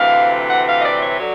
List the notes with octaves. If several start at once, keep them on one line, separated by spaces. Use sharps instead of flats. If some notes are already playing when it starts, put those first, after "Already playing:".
Already playing: D2 C3 E3 F5
F#5
F5
D#5
D5
C#5
D3 F#3